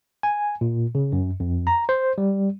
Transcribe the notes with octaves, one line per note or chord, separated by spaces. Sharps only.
G#5
A#2
C#3
F#2
F2
A#5
C5
G3